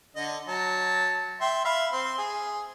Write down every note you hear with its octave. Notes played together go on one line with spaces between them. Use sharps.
D3 D#5
F#3 A5
E5 G5 C6
E5 F5 B5
C4 C6
G#4